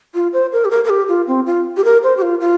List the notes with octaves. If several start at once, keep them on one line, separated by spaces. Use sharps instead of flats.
F4
C5
A#4
G4
A#4
A#4
G4
F4
C4
F4
G4
A#4
C5
G4
F4
F4